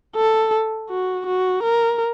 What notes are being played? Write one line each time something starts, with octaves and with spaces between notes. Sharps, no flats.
A4
F#4
F#4
A#4